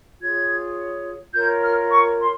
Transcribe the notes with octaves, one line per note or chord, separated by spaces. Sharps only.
F4 G#4 C#5 G#6
F4 A#4 C#5 G6
F6
C#6
C6